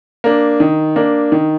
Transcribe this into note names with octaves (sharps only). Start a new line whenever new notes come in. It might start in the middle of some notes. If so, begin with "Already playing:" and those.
A#3 D4
D#3
A#3 D4
D#3